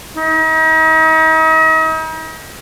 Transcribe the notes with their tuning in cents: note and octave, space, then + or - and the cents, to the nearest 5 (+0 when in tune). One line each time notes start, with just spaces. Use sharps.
D#4 +40